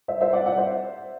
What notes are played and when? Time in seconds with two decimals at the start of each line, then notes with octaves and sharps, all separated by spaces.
0.08 C5 E5
0.21 C5 E5
0.33 D5 F#5
0.46 D5 F#5
0.58 C5 E5